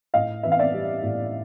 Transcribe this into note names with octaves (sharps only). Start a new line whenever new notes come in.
A2 D#5 F5
E3 E5
F5
D5 E5
G3
A2